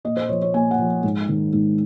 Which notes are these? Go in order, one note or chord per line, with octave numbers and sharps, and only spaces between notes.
A#2 D#5
C5
F3 C#5
C#5
A#2 G#5
F#5
F3
G#2
D#3
G#2